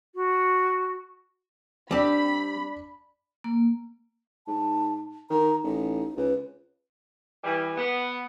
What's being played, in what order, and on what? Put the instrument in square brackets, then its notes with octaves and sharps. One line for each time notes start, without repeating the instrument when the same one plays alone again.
[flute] F#4
[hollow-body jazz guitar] G3 C4 [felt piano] D4 D5 [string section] B5
[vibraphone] A#3
[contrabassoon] G#2 [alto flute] A5
[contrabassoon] D#3 [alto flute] A#5
[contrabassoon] A1 [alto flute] D#4
[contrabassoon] C#2 [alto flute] B4
[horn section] E3 G3
B3